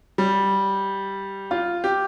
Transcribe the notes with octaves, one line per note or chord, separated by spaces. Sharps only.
G3
F4
G4